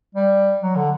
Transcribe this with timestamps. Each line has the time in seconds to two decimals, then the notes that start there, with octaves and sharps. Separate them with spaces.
0.15 G3
0.61 F#3
0.76 D3